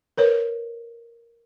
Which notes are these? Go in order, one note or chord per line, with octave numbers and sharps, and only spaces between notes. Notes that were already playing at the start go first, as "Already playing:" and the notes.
A#4 B4 C#5